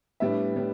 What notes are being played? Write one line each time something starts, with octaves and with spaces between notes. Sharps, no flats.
A2 G3 B3 D4 E5
A2 G3 B3 D4